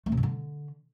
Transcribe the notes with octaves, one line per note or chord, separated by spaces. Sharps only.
A3
C3
G2
D3